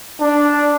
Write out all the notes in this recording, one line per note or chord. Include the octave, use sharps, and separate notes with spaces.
D4